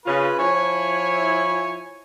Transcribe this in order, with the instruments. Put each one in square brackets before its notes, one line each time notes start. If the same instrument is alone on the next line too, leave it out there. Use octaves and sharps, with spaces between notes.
[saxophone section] C#3 C#4 F4 [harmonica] B4
[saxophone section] F3 E4 [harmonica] C#5 G#5